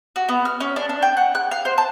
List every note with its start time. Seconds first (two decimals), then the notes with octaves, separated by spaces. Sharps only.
0.16 F#4
0.29 B3
0.45 F6
0.60 C#4
0.76 D4
0.89 D4
1.03 G5
1.17 F#5
1.35 F#6
1.51 F5
1.65 C5
1.78 A5